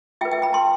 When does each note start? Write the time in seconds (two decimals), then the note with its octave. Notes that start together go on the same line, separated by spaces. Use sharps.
0.21 F4 E5 G5
0.25 B4
0.31 E5 G5
0.42 G5 B5
0.53 A5 C6